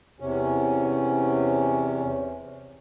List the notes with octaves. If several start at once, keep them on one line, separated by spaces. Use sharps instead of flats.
E2 C3 C#4